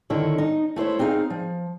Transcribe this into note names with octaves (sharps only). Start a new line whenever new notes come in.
D3 D#3 E4 C#5
D#4
A3 E4 C5 C#5
C4 D#4 G#4 E5 F5
F3